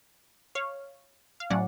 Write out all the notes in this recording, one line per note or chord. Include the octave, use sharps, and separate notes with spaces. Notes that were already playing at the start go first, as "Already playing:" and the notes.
C#5 F5
F5
A2 F#3 C#4 D5 F#5